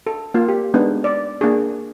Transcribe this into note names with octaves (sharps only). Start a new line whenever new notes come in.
A4
A#3 F4
G4
G#3 B3 D4 D#4
D5
A#3 D4 G#4